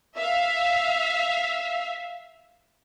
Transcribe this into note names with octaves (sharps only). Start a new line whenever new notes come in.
E5 F5